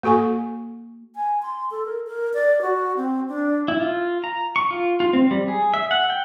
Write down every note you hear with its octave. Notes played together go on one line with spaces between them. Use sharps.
A#3 F#4 A4 G#5 C#6
G#5
C6
A4
A#4
A#4
D5
F#4
C4
D4
E4
F4
A#5
C#6
F4
F4
C4
G3
G#4
E5
F#5
G5